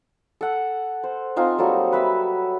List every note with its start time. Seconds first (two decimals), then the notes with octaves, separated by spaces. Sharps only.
0.41 A4 F#5
1.04 C5
1.36 C4 D#4 F4 G#5
1.58 F#3 G3 A#3 A4
1.92 B4 E5 E6